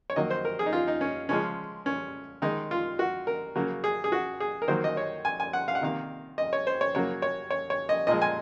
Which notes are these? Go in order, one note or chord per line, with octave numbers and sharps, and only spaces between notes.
C#5
D#3 F#3 A#3 D#5
C5
A#4
G#4
D#4
F4
D#4
C#4
C#3 F3 G#3 C#4
C#4
D#3 G#3 D#4
F4
F#4
A#4
C#3 F#3 A#3
G#4
G#4
F#4
G#4
A#4
D#3 F#3 A#3 C5
D#5
C#5
G#5
G#5
F#5
F5
F#5
C3 D#3 A#3 F5
D#5
C#5
C5
C#5
C#3 F#3 A#3 C#5
C#5
C#5
C#5
D#5
A#2 F3 G#3 D#5
G#5